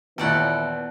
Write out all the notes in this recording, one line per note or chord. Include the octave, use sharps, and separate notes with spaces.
D#2 A#2 E3 B3 A4 D5 F#5